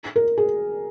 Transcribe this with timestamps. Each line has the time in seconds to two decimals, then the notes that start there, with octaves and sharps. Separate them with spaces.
0.16 A#4
0.38 G#4